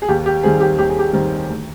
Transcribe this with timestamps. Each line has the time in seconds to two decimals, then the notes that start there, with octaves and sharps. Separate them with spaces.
0.02 G#4
0.08 D#2 G4
0.26 G4
0.43 D#3 G3 C4 G#4
0.60 G4
0.78 D#2 G4
0.89 G#4
0.99 G4
1.13 D#3 G3 C4
1.48 D2